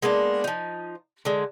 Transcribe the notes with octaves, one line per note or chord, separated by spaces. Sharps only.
G#3 A#3 B3 D4
F3 D#4
D3 G#3